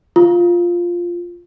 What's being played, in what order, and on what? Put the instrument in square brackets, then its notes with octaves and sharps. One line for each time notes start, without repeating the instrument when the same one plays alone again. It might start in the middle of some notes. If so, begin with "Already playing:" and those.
[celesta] F4